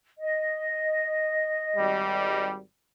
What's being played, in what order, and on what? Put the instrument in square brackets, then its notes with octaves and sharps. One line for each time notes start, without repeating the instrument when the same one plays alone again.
[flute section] D#5
[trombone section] G#1 G3